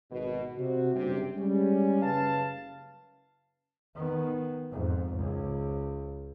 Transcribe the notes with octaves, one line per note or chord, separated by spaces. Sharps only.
G#1 B2
C3 F#4
F#1 G2 C3 G4
G3 G#3 C#4
F#1 C#3 B4 F5 A5
D#3 B3
F2 G#2
C#2